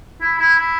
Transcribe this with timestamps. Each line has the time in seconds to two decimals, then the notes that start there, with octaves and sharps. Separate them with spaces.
0.21 E4
0.39 E4
0.57 E4